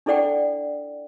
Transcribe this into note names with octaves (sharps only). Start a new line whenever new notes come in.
D4 E4 A4 D5 F#5 G5